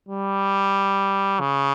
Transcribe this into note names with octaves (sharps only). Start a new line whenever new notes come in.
G3
C#3